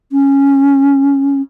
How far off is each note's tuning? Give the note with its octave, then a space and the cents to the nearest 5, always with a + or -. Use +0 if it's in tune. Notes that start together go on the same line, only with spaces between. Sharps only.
C#4 -5